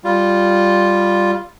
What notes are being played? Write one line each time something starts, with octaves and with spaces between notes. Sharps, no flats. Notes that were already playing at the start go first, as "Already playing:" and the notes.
G3 F4